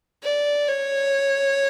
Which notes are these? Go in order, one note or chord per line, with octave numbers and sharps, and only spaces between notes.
D5
C#5